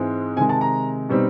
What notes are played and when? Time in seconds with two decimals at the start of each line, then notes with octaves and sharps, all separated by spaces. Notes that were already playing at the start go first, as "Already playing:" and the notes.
Already playing: G#2 E3 G#3 C4
0.36 C3 D#3 G#3 G#5
0.49 A5
0.61 A#5
1.09 B2 G3 C4 D#4